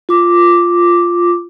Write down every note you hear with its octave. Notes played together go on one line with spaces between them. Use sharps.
F4 D6